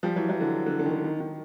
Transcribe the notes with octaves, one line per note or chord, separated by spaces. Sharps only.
F3 G3
E3 F#3
E3 F#3
D3 E3
D3
D3
D#3
D3
D#3
D#3